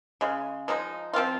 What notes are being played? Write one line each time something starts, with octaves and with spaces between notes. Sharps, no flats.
C#3 G#3
F3 G#3 D#4
F3 C4 F4